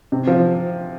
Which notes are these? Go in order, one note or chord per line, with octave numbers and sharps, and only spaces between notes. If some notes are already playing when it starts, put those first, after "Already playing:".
C3
F3